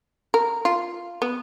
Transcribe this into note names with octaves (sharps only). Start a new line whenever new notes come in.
A#4
F4
B3